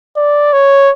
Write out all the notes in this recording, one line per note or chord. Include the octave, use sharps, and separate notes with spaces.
D5
C#5